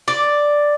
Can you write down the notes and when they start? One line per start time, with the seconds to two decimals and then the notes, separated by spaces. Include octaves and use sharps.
0.08 D5